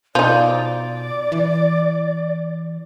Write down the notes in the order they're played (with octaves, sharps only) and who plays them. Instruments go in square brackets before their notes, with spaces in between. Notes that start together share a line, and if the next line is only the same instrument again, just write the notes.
[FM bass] B2 [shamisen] F3 D#4 [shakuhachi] D5
[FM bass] E3